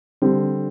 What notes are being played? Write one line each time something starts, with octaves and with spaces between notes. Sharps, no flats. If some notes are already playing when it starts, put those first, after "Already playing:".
D3 G3 C4